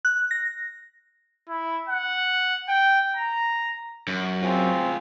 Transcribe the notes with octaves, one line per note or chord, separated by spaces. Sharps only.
F#6
A#6
E4
F#5
G5
A#5
F#2
C4 F4 G#4